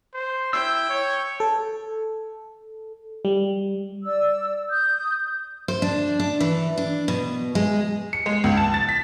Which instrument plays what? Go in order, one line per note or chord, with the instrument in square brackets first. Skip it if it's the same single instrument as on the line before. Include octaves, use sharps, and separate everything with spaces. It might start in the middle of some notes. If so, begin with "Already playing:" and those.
[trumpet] C5
[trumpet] E4 [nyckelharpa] G5 [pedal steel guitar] E6
[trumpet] C#5
[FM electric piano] A4
G3
[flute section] D5 E6
D#6 G6
[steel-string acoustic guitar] C5
D4
D4
E3
D4
B2
G#3
[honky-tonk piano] C#7
G#3
C#2
A5
A6
B6